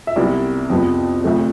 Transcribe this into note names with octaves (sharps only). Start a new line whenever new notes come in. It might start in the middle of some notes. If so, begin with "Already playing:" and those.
E5
C2 C3 G3 B3 D5
F2 C3 F3 B3
D2 C3 F3 A3